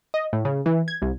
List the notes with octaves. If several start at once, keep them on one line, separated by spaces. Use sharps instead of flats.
D#5
A2
C#3
E3
G#6
C2